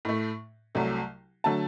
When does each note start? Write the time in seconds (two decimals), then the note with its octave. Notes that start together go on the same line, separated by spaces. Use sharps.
0.05 A2 A3
0.75 C2 C3 F#3 A3
1.44 D3 F#3 A3 A5